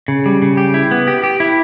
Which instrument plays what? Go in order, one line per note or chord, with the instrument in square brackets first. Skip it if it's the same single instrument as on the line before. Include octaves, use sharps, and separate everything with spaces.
[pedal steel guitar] C#3
G3
C#3
G4
E4
B3
G4
G4
E4